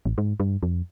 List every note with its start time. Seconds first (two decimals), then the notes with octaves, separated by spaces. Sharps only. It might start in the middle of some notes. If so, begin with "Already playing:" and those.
0.05 A1
0.18 G#2
0.40 G2
0.63 F2